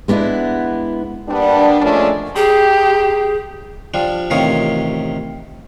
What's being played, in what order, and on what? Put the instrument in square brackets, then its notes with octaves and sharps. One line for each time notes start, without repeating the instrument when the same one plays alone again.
[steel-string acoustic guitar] G#3 B3 D4 E4
[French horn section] G3 A#3 B3 D4
A#2 F3 G#3 A3 C#4 D4
[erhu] G4 [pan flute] G#4
[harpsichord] F3 G3 D4
A1 C3 D#3 F4 C#5 D#6